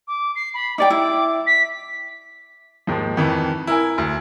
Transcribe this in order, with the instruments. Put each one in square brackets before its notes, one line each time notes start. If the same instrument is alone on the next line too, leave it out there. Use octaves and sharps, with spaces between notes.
[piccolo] D6
C7
B5
[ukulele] D#4 D5 G5 [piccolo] D6
[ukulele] E4
[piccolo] B6
[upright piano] D#2 G#2 F3
F2 D#3 E3
E4 A#4 G#5
D2